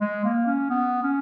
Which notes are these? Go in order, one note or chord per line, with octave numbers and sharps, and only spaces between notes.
G#3
A#3
C#4
B3
C#4